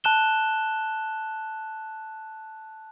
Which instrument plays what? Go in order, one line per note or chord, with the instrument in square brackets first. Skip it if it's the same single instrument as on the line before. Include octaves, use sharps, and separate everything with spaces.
[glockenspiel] A5 F#6 E7 G7